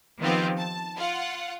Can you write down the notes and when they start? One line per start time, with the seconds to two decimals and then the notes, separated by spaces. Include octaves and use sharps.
0.20 D#3 F3 B3 C4 F4 G4
0.57 A5
0.97 F4 F#5